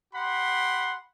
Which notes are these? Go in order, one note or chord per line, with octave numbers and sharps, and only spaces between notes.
G4 F#5 B5 C6